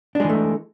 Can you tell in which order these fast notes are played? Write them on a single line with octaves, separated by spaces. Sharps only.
D4 G#3 E3 A3